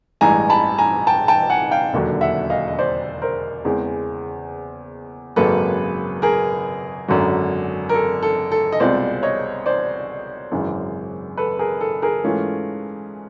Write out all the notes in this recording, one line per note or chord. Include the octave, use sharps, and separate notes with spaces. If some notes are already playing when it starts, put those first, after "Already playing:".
A1 G2 E3 G#3 G#5 A#5
A5 B5
G#5 A#5
G5 A5
G5 A5
F#5 G#5
F5 G5
E1 D#2 D3 F#3
E5 F#5
D#5 F5
D#5
C5 D5
A#4 C5
E2 C#3 E3 G#3 C4
G#1 F#2 C#3 F#3 A#3 A4 B4
G#4 A#4
G#1 F#2 D3 F#3
A#4
A4
A4
A4
D#5
C2 B2 G#3 C4 F4 C5 D5
C#5 D#5
C5 D5
G#1 F#2 C#3 E3
A4 B4
G#4 A#4
A4
G#4 A#4
G#2 E3 A3 C#4 F4